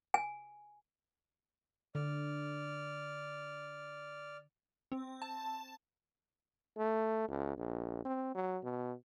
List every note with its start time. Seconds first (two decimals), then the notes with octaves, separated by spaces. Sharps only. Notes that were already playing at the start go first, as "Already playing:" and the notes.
0.14 G#5
1.95 D3 D5 F6
4.92 C4
5.22 A5
6.78 A3
7.28 C#2
7.58 A#1
8.05 C4
8.35 F#3
8.64 B2